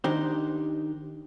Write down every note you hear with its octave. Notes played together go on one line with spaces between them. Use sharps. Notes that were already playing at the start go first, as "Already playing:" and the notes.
D#3 D4 D#4 G4 C5